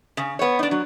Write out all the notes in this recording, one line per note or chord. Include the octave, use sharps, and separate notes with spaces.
C#3
B3 C#5
D4 D#4
F#3